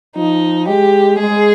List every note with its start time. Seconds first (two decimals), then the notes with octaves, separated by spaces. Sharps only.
0.16 F3 D#4
0.68 G#3 G4
1.19 G#3 G#4